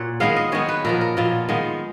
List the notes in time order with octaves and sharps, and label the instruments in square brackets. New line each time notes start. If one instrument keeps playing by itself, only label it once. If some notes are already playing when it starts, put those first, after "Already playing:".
Already playing: [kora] A#2 C#5 F#5
D#3 G#3 B3 F5
D#5
D#3 G#3 B3 C#5
B4
A#2 F3 B3 A#4
A#4
A#2 F3 B3 F4
D#3 G#3 B3 F4